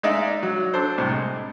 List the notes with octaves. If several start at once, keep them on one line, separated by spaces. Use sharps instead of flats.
G#3 D#4 D5 E5 F5
F#3
D4 A4 C5
C2 A2
G#3